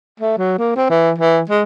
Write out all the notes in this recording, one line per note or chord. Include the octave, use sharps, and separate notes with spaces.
A3
F#3
A#3
C4
E3
E3
G#3